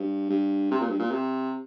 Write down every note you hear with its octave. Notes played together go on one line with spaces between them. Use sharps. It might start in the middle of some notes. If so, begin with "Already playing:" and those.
Already playing: G2
G2
C3
A#2
G2
A#2
C3